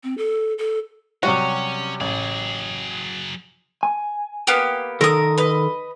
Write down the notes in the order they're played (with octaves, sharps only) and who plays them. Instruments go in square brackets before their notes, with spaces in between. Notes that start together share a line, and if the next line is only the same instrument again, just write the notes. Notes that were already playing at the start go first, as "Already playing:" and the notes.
[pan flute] C4
A4
A4
[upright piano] C3 F#3 G3 [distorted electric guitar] C#4 [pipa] F#4
[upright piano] A1 [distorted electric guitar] F#3 G#4
[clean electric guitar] G#5
[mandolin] A#3 B3 G4
[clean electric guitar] D#3 A4 [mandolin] A#4 D#6
[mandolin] B4 D#5